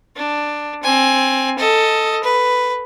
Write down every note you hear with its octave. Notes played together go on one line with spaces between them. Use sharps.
D4
C4 G#5
A4 D#5
B4